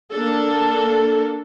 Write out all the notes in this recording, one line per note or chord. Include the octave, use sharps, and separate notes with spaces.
A#3 D4 A4